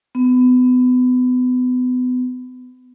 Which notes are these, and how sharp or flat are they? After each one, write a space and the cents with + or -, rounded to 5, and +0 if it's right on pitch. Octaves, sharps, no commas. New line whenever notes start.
B3 +30